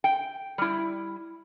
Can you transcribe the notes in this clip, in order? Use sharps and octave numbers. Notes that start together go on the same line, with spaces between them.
G5
G3 E4